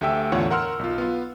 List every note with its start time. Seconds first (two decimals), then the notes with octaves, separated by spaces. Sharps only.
0.01 D2 A3 G4 E5 G5 E6
0.32 E2 A2 D3 F4 C#5 F#5
0.51 A#4 F#5 C6 E6 F6
0.79 B1 F4
0.98 B3 F4